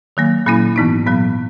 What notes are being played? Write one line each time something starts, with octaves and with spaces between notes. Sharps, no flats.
D#3 F#3 A#3
A#2 F#3 A#3 C#4 E4
G#2 E3 B3 D#4
A#2 F#3 B3